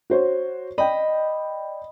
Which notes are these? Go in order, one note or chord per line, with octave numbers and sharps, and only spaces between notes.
F#4 C5 C#5
D5 D#5 G5 B5